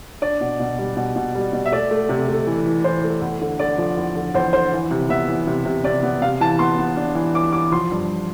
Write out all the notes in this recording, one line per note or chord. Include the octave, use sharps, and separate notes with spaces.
D4 D5
B2
B2
G3
B2
B2
G3
B2
E5
A3 D5
A3
C3
A3
E3
E3
E3 C5
A3
E2
D3
D3 D5
F3
E2
D3
E2 C5
D3 C5
E3
C3
B3 E5
E3
C3
C3
C3 D5
B3
C3 F5
E3 A5
B3 C6
B3
D4
E3
E3 D6
E3 D6
F3 C6
G2